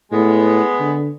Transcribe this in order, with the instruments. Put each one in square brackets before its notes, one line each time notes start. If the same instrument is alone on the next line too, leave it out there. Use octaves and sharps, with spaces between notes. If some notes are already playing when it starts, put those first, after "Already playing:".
[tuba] A2 [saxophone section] G#3 B3
[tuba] D3